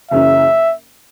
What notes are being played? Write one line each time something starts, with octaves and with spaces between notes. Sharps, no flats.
F#1 F#2 C#3 E3 C#4 E5